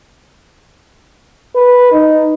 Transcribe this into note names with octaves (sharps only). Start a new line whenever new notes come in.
B4
D#4